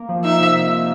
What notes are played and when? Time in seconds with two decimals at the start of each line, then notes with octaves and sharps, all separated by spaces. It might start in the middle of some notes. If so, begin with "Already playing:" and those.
Already playing: A#3
0.09 F3
0.24 D#4 E5
0.40 C3